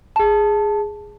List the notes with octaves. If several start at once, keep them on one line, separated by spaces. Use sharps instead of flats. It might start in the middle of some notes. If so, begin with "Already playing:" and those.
G#4 A5